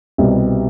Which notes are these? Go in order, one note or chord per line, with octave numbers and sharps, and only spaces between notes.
C2 B2 G3 C4